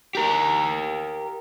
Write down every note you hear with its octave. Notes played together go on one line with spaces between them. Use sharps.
G4 A#4